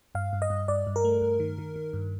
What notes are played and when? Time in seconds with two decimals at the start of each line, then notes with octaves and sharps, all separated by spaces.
0.15 G2 F5
0.33 G2
0.42 D#5
0.50 G2
0.68 G2 D5
0.87 G2
0.96 A#4
1.04 A3
1.21 G2
1.40 D#3
1.58 D#3
1.76 D#3
1.93 G2